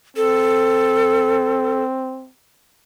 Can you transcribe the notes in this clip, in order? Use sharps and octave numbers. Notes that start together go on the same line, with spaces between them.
C4 A4